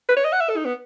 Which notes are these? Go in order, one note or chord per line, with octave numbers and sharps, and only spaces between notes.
B4
C#5
D#5
F#5
E5
A4
D#4
B3